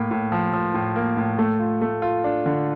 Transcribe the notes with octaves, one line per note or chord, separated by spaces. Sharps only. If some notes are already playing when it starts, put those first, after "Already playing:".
Already playing: A2 A#3
A2
F3
F3
A2
A#3
A2
A3
F4
A3
F4
D4
D3